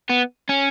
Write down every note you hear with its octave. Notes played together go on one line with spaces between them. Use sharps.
B3
C#4